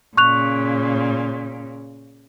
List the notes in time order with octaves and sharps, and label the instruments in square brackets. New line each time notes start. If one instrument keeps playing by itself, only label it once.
[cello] A#2 C#3 [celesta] C#6 F#6 F7